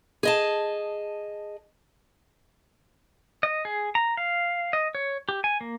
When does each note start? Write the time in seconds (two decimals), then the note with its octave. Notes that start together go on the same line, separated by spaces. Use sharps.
0.23 G#4 D#5 A5
3.43 D#5
3.65 G#4
3.95 A#5
4.17 F5
4.73 D#5
4.95 C#5
5.29 G4
5.44 G#5
5.61 A#3